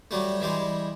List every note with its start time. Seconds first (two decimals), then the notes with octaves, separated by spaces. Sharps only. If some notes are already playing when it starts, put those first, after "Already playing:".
0.11 F#3 G3 A3
0.40 E3 G3 G#3